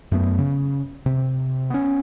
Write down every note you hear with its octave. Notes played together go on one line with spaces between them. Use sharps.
F#2 A3 B3
C#3
C3
B3 C#4